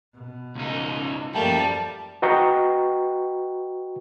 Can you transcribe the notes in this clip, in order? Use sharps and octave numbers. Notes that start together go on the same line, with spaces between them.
B2
C#2 D#4
F#2 F3 G3 A3 A#3 G5 A5
F#4 B4 D#5 G5 A#5 C#6